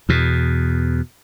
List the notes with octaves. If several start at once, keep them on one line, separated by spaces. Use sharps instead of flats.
E2 B2